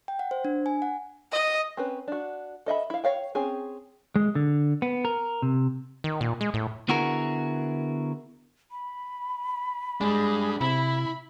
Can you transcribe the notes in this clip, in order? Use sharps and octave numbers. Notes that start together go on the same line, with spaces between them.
G5
F#5
C5
D4
G#5
F#5
D#5
C4 C#4 B4
D4 F#4
A4 D#5 E5 B5
E4 F5
C#5 F5 G5
C4 C#4 G#4
G#3
D3
B3
A#4
C3
D#3
A#2
G#3
A2
D3 B3 E4 F#4 G#4 A#4
B5
G3 G#3 D4 G#4
C3 E4 B5